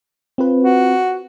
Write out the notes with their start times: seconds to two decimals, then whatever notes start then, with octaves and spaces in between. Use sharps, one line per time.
0.38 C4 F4 B4
0.63 F#4